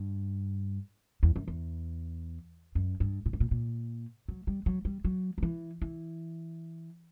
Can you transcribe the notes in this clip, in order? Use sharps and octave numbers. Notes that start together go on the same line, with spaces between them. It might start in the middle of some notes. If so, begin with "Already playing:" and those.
Already playing: G2
E2
F#2
E2
F#2
G2
A#2
G2
A#2
A#2
F#3
G3
F#3
G3
F#3
F#3
E3
E3